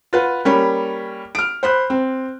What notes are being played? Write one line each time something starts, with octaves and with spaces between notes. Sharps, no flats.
F4 B4 F#5
G3 A#3 C#4 B5
F6 D7
C5 B5 F#6
C4